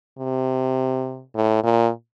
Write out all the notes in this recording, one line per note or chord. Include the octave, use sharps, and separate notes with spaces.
C3
A2
A#2